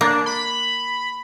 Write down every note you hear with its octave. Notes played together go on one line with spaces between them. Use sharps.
A#3 D4
B5